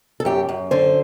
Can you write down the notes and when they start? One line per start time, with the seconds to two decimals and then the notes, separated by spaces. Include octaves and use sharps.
0.20 A4
0.25 F#2 G4
0.49 F#2
0.71 D3 C5